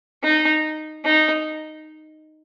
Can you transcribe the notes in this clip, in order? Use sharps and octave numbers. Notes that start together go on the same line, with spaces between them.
D#4
D#4